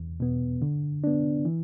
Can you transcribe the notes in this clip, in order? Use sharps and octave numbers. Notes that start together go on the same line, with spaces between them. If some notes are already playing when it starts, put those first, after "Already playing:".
Already playing: E2
B2 B3
D3
B3 D4
E3